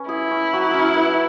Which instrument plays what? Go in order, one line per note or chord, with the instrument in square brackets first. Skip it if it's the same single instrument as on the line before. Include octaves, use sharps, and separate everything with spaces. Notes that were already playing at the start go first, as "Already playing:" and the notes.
Already playing: [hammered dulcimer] C#4 B4
[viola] E4 [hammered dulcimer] G#4
[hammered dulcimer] C#4
F#3
C#4
B4